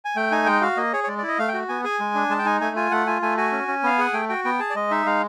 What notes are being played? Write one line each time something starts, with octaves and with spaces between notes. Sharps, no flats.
G#5
A3 G5
D#4 G#5
G#3 G5
F#4 F5
A#3 D#5
G#4 C#5
C#5
G#3 D5
E4 D5
D#5
A3 F5
G5
F#4
B3 G#5
G#4 G#5
G#3
D4
G#3 A5
G5
D#4 G#5
A3 G#5
F4 G#5
A3 F#5
F4 G#5
A3 G#5
F#4 G#5
C#4
C#4
B3 F5
G#4 F#5
A3 G5
F#4 G5
B3 G5
G#4 A5
D5
G#3 D#5
D#4 E5
G#3 F5